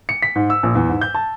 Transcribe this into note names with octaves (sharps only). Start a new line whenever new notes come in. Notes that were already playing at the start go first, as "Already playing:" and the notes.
C#7
B6
G#2
E6
A#1
E2
G#2
G6
A5